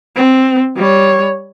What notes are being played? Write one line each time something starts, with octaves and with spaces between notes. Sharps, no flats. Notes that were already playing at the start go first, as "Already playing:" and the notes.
C4
G3 C#5